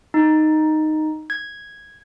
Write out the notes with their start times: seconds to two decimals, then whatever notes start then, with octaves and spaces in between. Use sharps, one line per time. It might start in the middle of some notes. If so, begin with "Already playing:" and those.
0.14 D#4
1.30 G#6